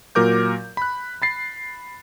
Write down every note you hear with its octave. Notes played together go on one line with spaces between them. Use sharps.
A#2 F#3 A#4 D6 G6
B5 F#6
B5 A6 C7